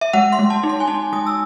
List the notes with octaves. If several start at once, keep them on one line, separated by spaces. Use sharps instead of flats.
E5
G#3 F#5
C6
G#3
A5
D#4
C6
G#5
D#4 A5
G#3 D#6
E6